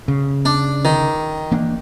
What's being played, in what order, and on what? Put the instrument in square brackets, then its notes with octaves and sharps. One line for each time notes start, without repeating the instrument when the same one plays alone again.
[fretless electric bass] C#3
[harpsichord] D4
D#3
[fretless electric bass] E3 A#3 D4